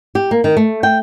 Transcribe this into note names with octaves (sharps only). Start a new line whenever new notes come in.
G4
A#3
D#3
A3
G5